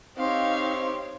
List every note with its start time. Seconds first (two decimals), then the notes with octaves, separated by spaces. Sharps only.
0.17 C4 D#4 G4 C5 C#5 F5